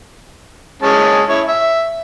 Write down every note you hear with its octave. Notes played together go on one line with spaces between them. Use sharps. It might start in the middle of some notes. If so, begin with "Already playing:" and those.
G#3 C#4 A5
E4 C#5
E5